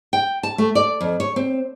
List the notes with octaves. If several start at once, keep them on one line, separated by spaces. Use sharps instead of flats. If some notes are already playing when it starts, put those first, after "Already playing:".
G5
A5
A3
D5
F2
C#5
C4